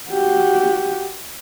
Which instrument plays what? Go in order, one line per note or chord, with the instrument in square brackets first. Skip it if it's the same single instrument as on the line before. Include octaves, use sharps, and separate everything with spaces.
[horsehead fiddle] F#4 G4